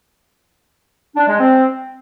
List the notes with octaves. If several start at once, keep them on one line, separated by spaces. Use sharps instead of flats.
D4
G#3
C4